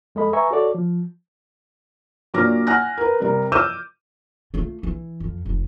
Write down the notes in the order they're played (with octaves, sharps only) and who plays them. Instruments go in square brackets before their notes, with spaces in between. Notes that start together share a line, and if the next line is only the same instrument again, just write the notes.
[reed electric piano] F2 G#3 A4 D#5 B5
B4 E5 G#5 A#5 C#6
F#4 A4 C#5 D5
F3
[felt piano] A#2 F#3 D4 D6 F6 A#6
F#5 G#5 F6 F#6 A#6
A#4 B4
C3 G3 A#4
D6 E6 F6 G6 D#7 E7
[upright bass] A3 F4
E3
F2
F1